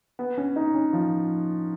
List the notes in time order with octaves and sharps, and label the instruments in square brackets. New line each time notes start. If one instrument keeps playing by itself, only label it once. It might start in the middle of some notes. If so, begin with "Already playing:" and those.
[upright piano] B3
C#4
D#4
C#4
F3